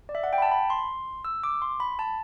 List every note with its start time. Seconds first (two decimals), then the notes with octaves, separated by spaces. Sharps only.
0.09 D5
0.15 E5
0.24 F#5
0.33 G5
0.38 B5
0.42 A5
0.51 B5
0.70 C6
1.25 E6
1.44 D6
1.62 C6
1.80 B5
1.99 A5